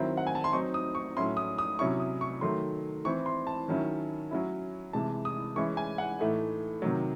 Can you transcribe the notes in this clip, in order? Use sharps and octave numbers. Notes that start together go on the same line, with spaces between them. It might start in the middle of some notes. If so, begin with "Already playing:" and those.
Already playing: D#3 F#3 C4 E4
F#5
G#5
A5
C6
F#3 C4 D#4 C#6
D#6
C#6
A2 F#3 C#4 E4 C6
D#6
D#6
C3 F#3 C#4 E4 C#6
D#6
C#6
D#3 F#3 A3 C6
E3 C4 E4 C#6
C6
A5
D#3 F#3 C#4 E4
F#3 C#4 E4
C3 E3 G#3 A5
D#6
E3 G#3 C#4 E4 C#6
G#5
F#5
A2 E3 A3 D#4
C3 D#3 F#3